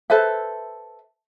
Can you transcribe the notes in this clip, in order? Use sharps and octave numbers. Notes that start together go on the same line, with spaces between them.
A4 B4 C5 E5